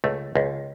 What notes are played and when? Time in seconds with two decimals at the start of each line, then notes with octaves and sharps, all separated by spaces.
0.04 C#2 A3
0.35 C#2